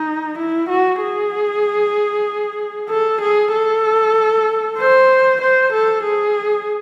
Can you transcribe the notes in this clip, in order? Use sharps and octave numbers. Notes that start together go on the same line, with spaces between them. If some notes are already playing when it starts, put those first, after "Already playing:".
Already playing: D#4
E4
F#4
G#4
A4
G#4
A4
C5
C5
A4
G#4